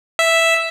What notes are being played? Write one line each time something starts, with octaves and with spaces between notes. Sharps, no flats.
E5